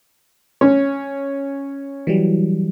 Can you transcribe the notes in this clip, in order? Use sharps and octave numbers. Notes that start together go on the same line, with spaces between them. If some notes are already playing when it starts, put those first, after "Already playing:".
C#4
E3 F#3 G3